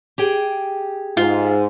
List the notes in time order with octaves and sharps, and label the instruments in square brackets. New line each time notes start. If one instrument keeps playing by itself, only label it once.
[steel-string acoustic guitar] G4 G#4 G5
[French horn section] G#2 [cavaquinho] F4